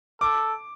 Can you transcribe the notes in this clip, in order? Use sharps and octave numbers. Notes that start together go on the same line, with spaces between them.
A4 D6